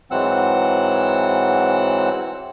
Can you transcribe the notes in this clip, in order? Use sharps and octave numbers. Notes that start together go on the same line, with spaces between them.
G#2 E3 F#3 C4 F#5 E6